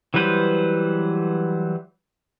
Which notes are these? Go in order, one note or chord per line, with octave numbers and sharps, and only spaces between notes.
E3 F#3 G3 B4 C5